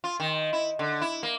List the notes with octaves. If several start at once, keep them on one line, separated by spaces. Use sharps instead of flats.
F4
D#3
E4
D3
E4
A#3